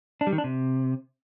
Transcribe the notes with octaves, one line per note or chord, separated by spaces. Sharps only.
D4
G3
D#3
D4
C3